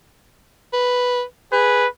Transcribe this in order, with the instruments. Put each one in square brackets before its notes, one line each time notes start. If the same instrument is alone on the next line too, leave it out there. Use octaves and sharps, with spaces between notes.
[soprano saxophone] B4
[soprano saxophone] G#4 [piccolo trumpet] B4